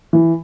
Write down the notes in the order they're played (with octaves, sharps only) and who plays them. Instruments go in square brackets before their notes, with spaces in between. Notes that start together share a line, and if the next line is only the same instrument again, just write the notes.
[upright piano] E3